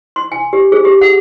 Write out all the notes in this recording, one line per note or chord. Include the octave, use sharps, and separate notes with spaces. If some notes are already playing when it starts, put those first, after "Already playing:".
C6
G#5
G4
G#4
G4
F#5